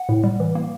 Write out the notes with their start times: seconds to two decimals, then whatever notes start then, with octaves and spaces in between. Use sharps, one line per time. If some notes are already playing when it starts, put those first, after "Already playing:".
Already playing: F#5
0.09 A2
0.24 G3
0.40 E3
0.55 A#3